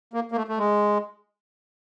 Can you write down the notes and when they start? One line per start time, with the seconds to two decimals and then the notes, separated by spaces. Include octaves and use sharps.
0.14 A#3
0.32 A#3
0.36 A3
0.48 A3
0.58 G#3